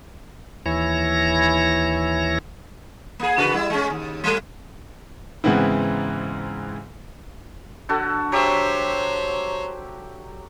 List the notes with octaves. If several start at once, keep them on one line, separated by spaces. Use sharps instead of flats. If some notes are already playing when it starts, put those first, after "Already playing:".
D#2 E3 E4 C#5 A#6
A#3 G#4
C#3 F#4 B4
G3 E4
G#3 C#4
D#2
G3 A3
G#2 C#3 E3 B3 C4 E4
D3 F#4 A4
F#3 G4 C5 C#5 E5